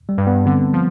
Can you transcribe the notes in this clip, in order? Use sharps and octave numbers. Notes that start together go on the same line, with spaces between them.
G3
G2
B3
D3 C4
F3